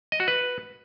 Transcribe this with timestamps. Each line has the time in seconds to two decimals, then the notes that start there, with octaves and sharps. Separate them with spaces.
0.12 D#5
0.20 F#4
0.28 B4